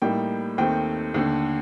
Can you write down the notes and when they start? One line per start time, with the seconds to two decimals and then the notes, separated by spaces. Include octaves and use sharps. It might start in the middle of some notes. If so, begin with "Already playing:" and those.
0.02 A2 G3 A#3 D#4 G5
0.58 D#2 D#3 A3 C4 G5
1.14 D#2 D3 A3